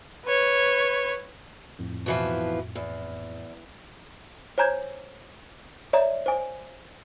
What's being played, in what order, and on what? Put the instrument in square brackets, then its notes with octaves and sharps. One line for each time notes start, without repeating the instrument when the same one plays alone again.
[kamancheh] B4 C#5
[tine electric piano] F2 A2
[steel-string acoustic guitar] B2 E3 F3
E2
[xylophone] C5 C#5 G#5 A#5 G6 G#6
C#5 D5 E5 A#5
C5 G#5